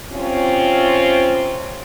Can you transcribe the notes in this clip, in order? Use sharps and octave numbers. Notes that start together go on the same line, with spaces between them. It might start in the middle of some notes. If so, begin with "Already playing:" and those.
C3 C4 C#4 F4